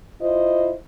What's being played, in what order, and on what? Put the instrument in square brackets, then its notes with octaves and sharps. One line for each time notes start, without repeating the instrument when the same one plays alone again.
[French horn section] E4 F4 C5 D#5